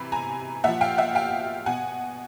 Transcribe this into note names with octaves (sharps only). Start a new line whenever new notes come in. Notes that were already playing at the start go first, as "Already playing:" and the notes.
Already playing: C3 E3 B5
G#5 A#5
A#2 F3 E5 F#5
F5 G5
E5 F#5
F5 G5
B2 F#5 G#5